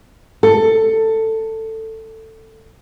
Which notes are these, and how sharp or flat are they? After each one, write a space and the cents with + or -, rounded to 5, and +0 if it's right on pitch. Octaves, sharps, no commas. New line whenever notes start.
A4 +15